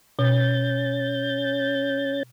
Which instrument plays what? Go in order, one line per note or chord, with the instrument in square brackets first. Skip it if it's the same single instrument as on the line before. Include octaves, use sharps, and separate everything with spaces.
[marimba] B2 [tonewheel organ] C#4 G6 A6